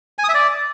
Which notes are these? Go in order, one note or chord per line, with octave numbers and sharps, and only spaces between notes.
G#5
D#6
E5
D5